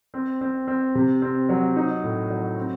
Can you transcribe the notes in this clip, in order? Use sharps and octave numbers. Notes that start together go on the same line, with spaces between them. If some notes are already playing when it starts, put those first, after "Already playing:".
C4
C4
C4
C3
C4
F#3
D#4
A2
F#3
C4